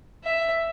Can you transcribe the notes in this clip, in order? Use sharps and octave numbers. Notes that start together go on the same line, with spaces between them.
E5